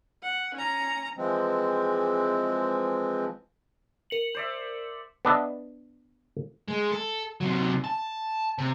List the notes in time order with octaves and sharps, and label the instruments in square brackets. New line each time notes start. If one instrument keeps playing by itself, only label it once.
[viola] F#5
C#4 A#5
[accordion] E3 F3 G#3 C4
[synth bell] A#4 C#7 F#7
[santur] C5 D5 E5
[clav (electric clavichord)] B3 D4 D#5 E5
[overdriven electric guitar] G#3
A4
C3 F#3
A5
C3